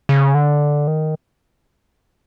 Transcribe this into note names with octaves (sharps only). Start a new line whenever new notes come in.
C#3
D3
D#3